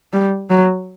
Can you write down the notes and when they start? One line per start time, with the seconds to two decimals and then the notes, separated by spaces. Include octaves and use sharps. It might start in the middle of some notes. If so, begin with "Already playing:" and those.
0.13 G3
0.50 F#3